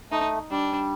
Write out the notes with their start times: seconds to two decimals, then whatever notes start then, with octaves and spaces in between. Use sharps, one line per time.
0.11 A3 D#4
0.51 G3 D4